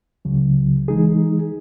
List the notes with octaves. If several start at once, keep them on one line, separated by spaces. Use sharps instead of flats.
C#2 C#3 F#3
E3 G#3 D#4 G#4